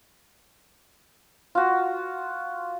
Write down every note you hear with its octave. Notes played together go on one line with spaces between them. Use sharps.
F4 F#4